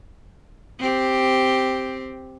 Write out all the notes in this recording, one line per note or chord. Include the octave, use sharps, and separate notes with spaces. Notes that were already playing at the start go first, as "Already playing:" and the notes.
C4 G4